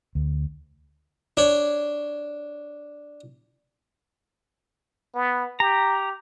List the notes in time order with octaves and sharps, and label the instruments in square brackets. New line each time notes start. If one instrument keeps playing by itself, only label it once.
[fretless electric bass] D2
[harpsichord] D4 C#5
[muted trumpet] B3
[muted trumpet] G4 [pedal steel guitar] A#5